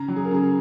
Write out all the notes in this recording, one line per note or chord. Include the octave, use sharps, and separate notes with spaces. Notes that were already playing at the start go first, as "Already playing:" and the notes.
Already playing: C#3 A#5
F#3
G#4
A#4
C#3 G#4